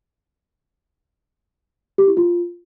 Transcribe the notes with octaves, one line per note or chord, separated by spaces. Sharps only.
G4
E4
F4